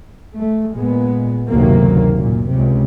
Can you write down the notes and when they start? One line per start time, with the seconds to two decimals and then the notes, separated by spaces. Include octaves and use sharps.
0.36 A3
0.74 A#2 G#3 B3
1.49 F#1 D2 C3 D#3 F#3 A#3
2.15 F#2 A#2
2.49 C#2 C3